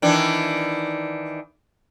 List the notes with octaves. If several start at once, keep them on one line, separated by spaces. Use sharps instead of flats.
D#3 E3 D4